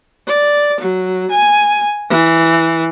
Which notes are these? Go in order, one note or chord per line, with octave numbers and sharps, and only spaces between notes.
D5
F#3
G#5
E3